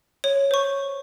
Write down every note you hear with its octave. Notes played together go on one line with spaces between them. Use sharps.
C#5
C5 C#6